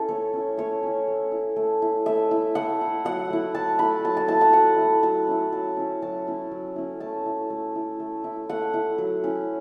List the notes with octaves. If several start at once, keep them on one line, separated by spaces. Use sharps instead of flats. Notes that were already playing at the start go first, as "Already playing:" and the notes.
Already playing: C#4 E4 A4
A3 C#5
C#4 E4
A3 C#5
C#4 E4
A3
E4
A3
E4
A3 E5
E4
A3 F#5
E4
F#3 F#5
A3 E4
F#3 A5
A3 E4 B5
F#3 A5
A5
A3 E4 A5
F#5
F#3 F#5
A3 E4
F#3 A5
C#4 E4
F#3 A5
C#4 E4
F#3 A5
C#4 E4
F#3
C#4 E4
A3 A5
E4
A3
E4
A3
E4
A3 F#5
E4
F#3
C#4 E4